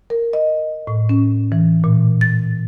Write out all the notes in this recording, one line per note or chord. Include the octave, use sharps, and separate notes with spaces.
A#4
D#5
A2
C#4
E3
A#2
A6